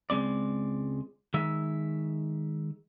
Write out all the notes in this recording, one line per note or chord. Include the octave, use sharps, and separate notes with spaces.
C#2 G#3 C4 D5
D#3 G#3 E5